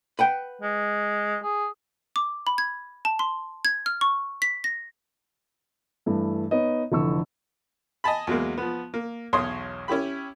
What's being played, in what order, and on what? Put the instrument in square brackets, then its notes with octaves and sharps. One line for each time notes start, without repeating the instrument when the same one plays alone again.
[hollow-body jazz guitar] B4 F#5 G5
[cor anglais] G#3
G#4
[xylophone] D6
B5
G#6
A5
C6
G#6
F6
C#6
B6
A#6
[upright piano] G2 E3 A3
B3 D#4 C#5 D#5
F1 D3 E3 C#6 E6
[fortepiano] D#5 G#5 A5 B5
E2 F#3 G#3 A#3
F3 B3
A#3
B1 E2 C#5 C6 D#6
C#4 E4 G4 B5